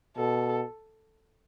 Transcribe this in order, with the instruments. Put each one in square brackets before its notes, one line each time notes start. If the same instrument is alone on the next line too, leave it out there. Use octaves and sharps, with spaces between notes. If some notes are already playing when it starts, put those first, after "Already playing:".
[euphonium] B2 [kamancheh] A4